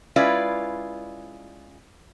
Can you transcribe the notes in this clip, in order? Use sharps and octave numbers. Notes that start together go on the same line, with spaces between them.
G#3 C#4 E4 F4 B4 D5